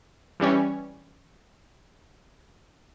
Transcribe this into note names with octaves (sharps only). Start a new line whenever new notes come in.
E3 G3 C#4 C#5